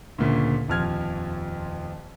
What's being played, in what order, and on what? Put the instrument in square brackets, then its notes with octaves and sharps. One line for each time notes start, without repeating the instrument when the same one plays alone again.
[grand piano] D2 A#2 C#3
D#1 F2 F3 F6 G#6